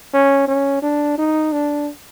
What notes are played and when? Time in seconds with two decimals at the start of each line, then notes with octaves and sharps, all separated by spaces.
0.14 C#4
0.48 C#4
0.82 D4
1.18 D#4
1.53 D4